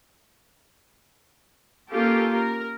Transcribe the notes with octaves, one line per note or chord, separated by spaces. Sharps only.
A#3 C#4 F4 G4 A4
A#4